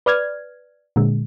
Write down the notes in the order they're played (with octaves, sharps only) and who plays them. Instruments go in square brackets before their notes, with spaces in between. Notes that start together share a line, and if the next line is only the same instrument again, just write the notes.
[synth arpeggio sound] B4 D5 F6 G#6
A#2 D3 G#3